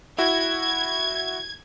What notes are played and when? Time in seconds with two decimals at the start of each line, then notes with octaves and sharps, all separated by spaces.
0.18 E4 F#4 G#6